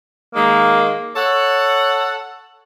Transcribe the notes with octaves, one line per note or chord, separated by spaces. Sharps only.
D#3 G#3 A#3
A4 C#5 F#5